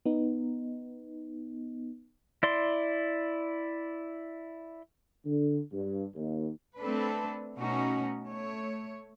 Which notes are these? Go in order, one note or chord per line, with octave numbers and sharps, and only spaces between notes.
B3 D#4
E4 D5 C6
D3
G2
D#2
A3 C4 D4 A4 B4
B2 A3 C#4 D#4 F#4
A3 C#5